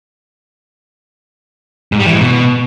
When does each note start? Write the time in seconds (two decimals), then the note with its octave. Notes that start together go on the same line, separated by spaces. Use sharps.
1.92 G#2
1.99 G3
2.06 E3
2.13 G#2
2.20 B2